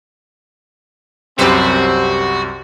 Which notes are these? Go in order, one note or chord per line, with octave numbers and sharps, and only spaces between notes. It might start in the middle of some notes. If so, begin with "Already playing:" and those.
C2 F#2 C4 F#4 G4 B4 C5